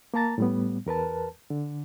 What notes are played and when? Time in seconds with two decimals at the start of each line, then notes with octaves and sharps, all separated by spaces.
0.14 A#3 A#4 A5 A#5 A6
0.38 A2 G3 B3
0.86 E2 A#4 B4 A5
1.50 D3